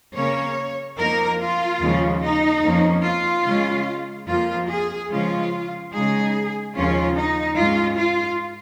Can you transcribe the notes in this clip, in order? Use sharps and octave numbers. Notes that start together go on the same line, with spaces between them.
C#3 A#3 C#4 C#5
F2 F3 A#3 D#4 A#4
F4
D#2 C#3 F3 G#3 C#4
D#4
F2 F3 A#3 C#4
F4
C#3 G#3 C#4
F2 F3 A#3 F4
G#4
C#3 F3 G#3 C#4 F4
C#3 G#3 D#4 G#4
D#2 C#3 F3 C#4 F4
D#4
G#2 G#3 C#4 F4
F4